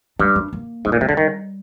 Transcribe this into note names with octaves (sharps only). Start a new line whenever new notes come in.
G2 D4
D4
A#3
G#2 D4
A#2 C4
C3 A#3
D3 G#3
D#3 G3